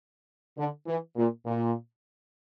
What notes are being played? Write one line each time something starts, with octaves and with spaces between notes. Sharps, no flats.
D3
E3
A#2
A#2